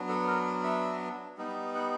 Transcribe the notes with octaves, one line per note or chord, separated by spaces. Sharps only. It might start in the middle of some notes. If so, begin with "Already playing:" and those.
Already playing: F#3 B3 D4
A4
A#4
E5
G3 B3 D#4
F#5